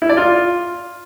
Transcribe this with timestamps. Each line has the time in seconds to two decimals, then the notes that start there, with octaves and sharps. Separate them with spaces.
0.02 E4
0.09 D5
0.17 F4